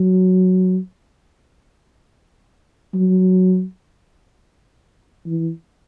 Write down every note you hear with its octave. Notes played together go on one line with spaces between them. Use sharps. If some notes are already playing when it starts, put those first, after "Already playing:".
Already playing: F#3
F#3
E3